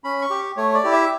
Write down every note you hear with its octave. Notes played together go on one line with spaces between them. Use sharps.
C#4 B5
C#6
G4
A3 C#5
D5
E4 G4
E5